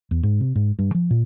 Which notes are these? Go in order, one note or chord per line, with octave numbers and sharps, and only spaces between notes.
E2
G#2
C3
G#2
G2
F3
A#2